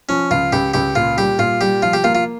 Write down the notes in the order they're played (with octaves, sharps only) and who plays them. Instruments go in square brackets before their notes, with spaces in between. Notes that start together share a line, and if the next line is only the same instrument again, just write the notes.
[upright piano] F3 [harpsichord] C#4
[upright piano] C#2 [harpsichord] F4
[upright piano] C#2 [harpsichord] G4
[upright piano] C#2 [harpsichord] G4
[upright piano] A#2 [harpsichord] F4
[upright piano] G3 [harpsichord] G4
[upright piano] A#2 [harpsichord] F4
[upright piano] G3 [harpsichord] G4
[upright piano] F3 [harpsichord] F4
[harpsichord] G4
[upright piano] A#3 [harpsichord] F4
[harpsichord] F4